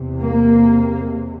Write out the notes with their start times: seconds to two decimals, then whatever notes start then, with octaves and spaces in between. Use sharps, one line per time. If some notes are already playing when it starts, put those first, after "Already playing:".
Already playing: E2 C3
0.19 A#3